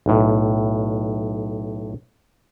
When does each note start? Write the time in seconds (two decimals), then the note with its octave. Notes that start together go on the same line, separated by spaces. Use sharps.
0.06 B1 A2